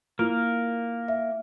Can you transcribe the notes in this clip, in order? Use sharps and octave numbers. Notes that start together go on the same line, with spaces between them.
A#3 E4 F4 A#4
E5